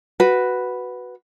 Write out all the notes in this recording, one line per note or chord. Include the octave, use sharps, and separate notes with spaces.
F#4 B4